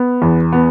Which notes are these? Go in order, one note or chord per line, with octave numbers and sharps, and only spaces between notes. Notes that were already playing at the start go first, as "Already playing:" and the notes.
Already playing: B3
E2
B3